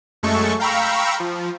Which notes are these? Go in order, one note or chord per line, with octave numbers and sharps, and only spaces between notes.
F#2 G#3 A3 A4 C#6
F5 G5 A#5 B5 C#6 E6
F3